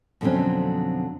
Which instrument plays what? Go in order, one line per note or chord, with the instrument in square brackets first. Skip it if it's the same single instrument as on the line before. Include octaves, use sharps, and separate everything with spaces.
[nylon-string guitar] F2 B2 D3 F#3 C4 C#4